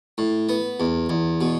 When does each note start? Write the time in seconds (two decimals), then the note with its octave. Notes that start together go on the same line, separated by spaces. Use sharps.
0.18 A2
0.49 B3
0.80 E2
1.09 E2
1.41 B2